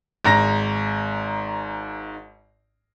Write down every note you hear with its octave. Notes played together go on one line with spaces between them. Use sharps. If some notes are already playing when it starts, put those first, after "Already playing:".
G#1 G#2 A#5 A#6